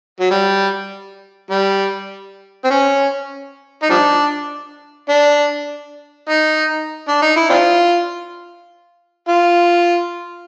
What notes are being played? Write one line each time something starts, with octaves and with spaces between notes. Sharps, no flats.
F#3
G3
G3
C4
C#4
D#4
F3 G3 D4
D4
D#4
D4
D#4
E4
C4 D4 F4
F4